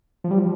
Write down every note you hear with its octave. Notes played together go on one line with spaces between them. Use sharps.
F3
G3
F3